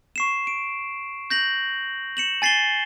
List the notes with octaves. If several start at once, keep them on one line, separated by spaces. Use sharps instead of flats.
C#6 C7 E7
D7
G6 A#6 F#7
C#7 E7 F#7
G#5 A6 C7 E7 G7